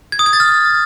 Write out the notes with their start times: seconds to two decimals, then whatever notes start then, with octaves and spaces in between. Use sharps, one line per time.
0.12 G#6
0.19 D#6
0.26 G#6
0.33 A6
0.40 F6